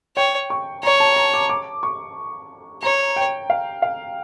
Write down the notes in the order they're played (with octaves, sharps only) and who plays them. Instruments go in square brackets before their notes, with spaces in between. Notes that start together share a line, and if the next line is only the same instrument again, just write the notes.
[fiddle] C#5 [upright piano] G5
[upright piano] C#6
[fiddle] C#5 [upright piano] A#5
[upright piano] A5
A#5
D6
D6
C#6
[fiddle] C#5 [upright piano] A#5
[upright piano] G5
F5
F5